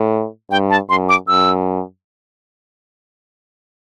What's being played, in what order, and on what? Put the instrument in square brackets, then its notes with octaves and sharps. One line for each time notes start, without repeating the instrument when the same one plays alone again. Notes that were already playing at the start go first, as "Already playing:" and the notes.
Already playing: [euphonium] A2
[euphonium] G2 [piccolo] G5
[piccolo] A5
[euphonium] F#2 [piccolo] C6
[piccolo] D6
[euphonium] F#2 [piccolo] E6